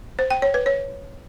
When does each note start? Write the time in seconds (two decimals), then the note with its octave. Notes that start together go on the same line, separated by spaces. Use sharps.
0.19 C5
0.30 G5
0.42 C#5
0.54 B4
0.66 C#5